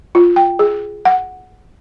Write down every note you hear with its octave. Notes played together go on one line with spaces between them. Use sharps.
F4
G5
G#4
F#5